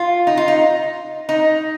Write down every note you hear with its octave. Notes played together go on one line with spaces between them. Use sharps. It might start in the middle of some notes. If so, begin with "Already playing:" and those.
Already playing: F4
D#4
F4
D#4
D#4